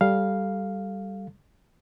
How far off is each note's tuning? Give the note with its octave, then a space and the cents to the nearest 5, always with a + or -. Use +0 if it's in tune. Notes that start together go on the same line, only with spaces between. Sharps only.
G3 -5 A4 +0 F5 +0